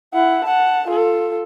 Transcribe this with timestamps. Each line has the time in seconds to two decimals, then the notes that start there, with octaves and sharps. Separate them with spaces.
0.14 E4 F#5
0.44 F#5 A5
0.87 F4 A4